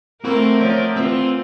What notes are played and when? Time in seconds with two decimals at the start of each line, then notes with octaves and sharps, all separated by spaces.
0.24 A3 A#3 C4 E4 F#4 A#4
0.61 F3 F#3 D5
0.96 E3 C4 F4 E5